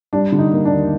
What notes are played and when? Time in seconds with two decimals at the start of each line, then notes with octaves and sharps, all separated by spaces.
0.13 G3 D4
0.32 D3
0.39 D#4
0.52 A#3
0.65 D4
0.72 D#2